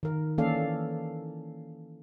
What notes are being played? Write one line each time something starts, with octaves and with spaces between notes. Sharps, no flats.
D#3 A#4
E3 A#3 C#4 A4 D5 F5